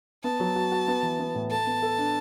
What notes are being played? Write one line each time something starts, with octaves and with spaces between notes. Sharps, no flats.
B3 A5
F#3
F#4
F#4
B3
E3
B3
A2
A4 A5
B3
A4
D4